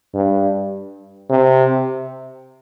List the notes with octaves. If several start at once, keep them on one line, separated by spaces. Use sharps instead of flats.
G2
C3